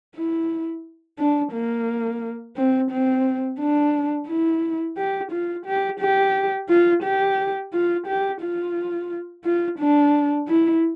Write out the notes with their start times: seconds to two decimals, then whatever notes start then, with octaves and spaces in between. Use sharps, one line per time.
0.16 E4
1.18 D4
1.53 A#3
2.56 C4
2.91 C4
3.60 D4
4.28 E4
4.97 G4
5.32 F4
5.66 G4
6.00 G4
6.69 F4
7.03 G4
7.73 F4
8.07 G4
8.41 F4
9.44 F4
9.79 D4
10.48 E4